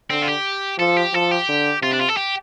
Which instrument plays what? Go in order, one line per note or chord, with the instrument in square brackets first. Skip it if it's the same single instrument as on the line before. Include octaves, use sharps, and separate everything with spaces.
[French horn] D3 [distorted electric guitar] C4
[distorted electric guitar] F4
G4
[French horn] F3 [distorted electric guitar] A4
[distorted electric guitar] G4
[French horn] F3 [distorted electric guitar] A4
[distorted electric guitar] G4
[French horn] D3
[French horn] C3 [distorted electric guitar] F4
[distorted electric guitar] D4
F4
A4
G4